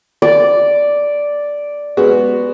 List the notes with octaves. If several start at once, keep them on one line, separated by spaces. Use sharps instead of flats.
D5
G#3 B3 F#4